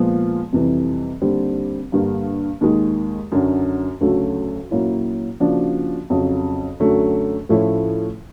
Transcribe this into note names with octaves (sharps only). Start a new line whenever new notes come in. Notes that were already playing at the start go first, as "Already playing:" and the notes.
Already playing: A#2 F3 G#3 B3
F2 C3 E3 G3
D#2 D3 G3 C4
G2 D3 G3 A#3
D#2 D#3 G#3
F#2 D3 F#3
D2 C#3 F#3 A3
A#2 F#3 A#3 C#4 E4
C#3 F3 A#3 D4 F#4
F2 C#3 F#3
F#2 D3 F#3 A3
A2 F3 A3 C#4 E4